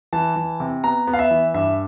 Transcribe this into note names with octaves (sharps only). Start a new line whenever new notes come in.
E3 A5
E3
C3
B3 A#5
B3
F5
E5
E3
G2 E5